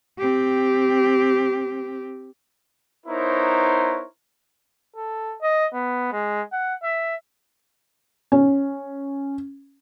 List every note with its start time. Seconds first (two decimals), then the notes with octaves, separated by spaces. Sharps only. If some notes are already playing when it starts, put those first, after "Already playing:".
0.18 C4 G4
3.06 B3 D#4 E4 A#4 C5 C#5
4.96 A4
5.42 D#5
5.74 B3
6.12 G#3
6.52 F#5
6.83 E5
8.32 C#4